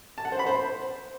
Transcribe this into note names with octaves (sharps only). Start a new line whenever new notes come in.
A5
F#5
C5
B5
C5